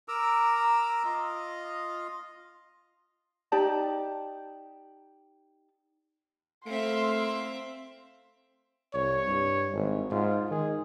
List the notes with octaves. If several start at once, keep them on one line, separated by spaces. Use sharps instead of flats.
A#4 A#5 D6 E6
F4 D#5
D#4 G4 D5 A5
A3 A#3 C4 E4 E5 F5 C6
C2 C#5
G2
G#1
G#2 F4
D#3 G#4